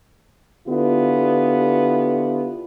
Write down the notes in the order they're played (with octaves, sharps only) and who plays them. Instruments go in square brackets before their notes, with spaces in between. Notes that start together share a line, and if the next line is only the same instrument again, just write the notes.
[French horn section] D3 B3 E4 F4 G4